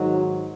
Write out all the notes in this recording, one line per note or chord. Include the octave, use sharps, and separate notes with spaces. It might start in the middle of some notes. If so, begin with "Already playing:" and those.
Already playing: G#2 D#3 F#3